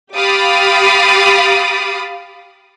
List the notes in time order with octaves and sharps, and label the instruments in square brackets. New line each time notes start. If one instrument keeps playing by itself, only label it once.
[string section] G4 F5 B5 D6 D#6 A6